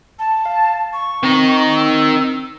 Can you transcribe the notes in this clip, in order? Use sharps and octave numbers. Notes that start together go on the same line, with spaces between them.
A5
F5
C#6
D#3 C4 D#4
E6